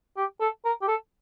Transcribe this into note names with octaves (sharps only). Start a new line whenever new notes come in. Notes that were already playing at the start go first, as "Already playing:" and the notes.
G4
A4
A#4
G4
A4